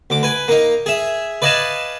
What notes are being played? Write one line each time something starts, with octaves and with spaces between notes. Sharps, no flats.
D2 D6
B4 G#5
A#3 D#4
G#4 E5
B4 D5 D#5 F5 G#5 A5